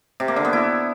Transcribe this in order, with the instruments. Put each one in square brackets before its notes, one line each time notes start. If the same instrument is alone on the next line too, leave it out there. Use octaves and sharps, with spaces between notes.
[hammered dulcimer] C3
A#3
D3
B3
E4